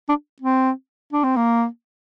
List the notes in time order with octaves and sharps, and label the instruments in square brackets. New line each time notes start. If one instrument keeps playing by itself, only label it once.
[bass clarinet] D4
C4
D4
C4
A#3